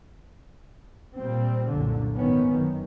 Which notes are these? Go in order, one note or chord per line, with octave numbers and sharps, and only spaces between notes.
A#2 G3 C4
C2 F#2 A#2 D3
G1 G#2 D#3 F3 B3 C#4
F#2 D#3